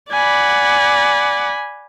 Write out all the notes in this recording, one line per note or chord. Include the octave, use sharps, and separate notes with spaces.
D5 F#5 G#5 B5